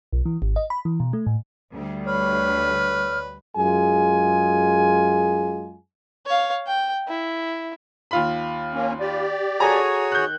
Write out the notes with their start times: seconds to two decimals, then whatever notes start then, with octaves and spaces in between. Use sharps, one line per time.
0.13 B1
0.26 E3
0.42 G#1
0.56 D#5
0.70 B5
0.85 E3
1.00 B2
1.13 A3
1.26 A2
1.71 D2 G3
2.07 B4 C#5 F6
3.57 F#2 G#3 F4 G#4 G#5
6.26 C#5 F5
6.67 G5
7.08 E4
8.11 D#2 F4 B5
8.74 A#3 C#4
9.00 G4 D5
9.60 F#4 G#4 A4 C#5 G#5 A#5
10.12 D#3 F#6 G6